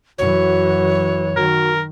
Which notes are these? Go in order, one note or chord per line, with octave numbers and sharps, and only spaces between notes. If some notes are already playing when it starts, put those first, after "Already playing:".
F#2 E3 F#4 C#5
D#3 F#4 A#4